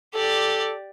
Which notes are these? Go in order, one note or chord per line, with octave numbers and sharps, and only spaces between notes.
G4 A4 D5